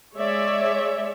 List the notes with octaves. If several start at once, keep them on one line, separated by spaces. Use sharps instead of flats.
G#3 C#5 D5 E5